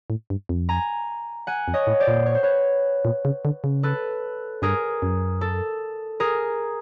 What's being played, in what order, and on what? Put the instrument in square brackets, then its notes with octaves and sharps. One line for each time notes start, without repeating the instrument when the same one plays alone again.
[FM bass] A2
G2
F2
[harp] G#5 A#5
F#5 G#5
[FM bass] F2
[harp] C#5 D#5
[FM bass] A2
[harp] C5 D5
[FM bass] A#2
[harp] C#5
C5
B4 C#5
[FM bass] A#2
C#3
D3
C#3
[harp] A4 B4
[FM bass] G2 [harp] G#4 A#4
[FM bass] F#2
[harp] A4
G#4 A#4